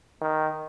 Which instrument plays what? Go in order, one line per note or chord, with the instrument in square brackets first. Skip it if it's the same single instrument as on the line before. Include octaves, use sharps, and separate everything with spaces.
[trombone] D#3